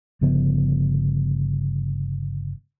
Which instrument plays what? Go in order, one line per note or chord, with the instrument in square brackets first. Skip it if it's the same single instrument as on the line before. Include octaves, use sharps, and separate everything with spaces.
[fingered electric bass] G1 C#3 F3 B3